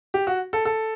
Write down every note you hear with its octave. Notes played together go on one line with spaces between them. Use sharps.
G4
F#4
A4
A4